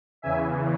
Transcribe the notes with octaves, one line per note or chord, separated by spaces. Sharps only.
E2 C#3 E3 E5 G#5